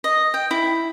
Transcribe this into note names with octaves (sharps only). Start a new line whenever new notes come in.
D#5
G5
E4